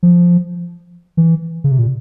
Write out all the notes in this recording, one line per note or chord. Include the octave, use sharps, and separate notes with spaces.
F3
E3
C#3
C3
A#2